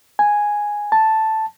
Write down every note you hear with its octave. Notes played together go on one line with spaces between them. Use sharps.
G#5
A5